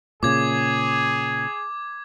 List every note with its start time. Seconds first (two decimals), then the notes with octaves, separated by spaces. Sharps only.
0.23 A#2 C#3 G#4 D6 G#6